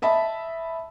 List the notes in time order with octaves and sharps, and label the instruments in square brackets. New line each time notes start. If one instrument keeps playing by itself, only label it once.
[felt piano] D#5 E5 A5 B5